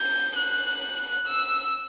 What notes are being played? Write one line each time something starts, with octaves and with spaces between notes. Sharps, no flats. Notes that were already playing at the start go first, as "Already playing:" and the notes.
Already playing: G6
F#6
E6